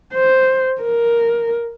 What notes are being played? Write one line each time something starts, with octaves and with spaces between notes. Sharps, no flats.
C5
A#4